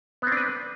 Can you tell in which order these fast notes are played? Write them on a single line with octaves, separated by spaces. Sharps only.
B3 C4 D4 B4